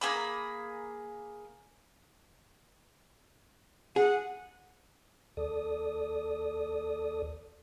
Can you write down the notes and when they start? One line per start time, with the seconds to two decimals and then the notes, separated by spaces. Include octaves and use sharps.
0.01 A#3 D4 G#4 B5
3.96 G#4 F#5
5.37 D#2 A4 D5 D#6